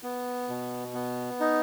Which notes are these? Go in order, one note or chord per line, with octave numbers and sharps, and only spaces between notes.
B3
B2
B3
D#4